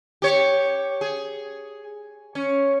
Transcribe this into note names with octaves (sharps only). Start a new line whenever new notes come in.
G4 C#5
G#4
C#4